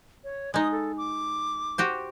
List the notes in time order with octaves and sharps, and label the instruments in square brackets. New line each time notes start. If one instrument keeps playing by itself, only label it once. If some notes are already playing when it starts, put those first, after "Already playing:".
[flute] C#5
[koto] G#3 D#4 [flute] D#6
[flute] A4
D6
[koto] F#4 G4 C5